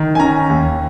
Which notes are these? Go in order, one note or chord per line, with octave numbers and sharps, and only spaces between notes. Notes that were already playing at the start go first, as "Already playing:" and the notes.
Already playing: D#3
G#5
C#4 A#5
D#2